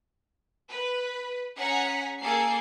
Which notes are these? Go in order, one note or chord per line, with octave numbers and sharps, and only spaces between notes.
B4
C#4 G#4 F#5 A#5 B6 C#7
A#3 G#4 A4 C7